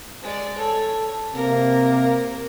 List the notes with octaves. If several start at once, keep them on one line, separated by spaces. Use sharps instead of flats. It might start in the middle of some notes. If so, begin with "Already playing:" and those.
G#3 D5
A4 C#5
C3 A#3 A#4